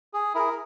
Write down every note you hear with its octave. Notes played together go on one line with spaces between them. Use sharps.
G#4
E4 G#4 A#4